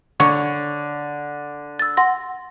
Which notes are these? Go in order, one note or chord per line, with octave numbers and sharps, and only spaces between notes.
D3 C#5
E6 A6
F#5 C6 A#6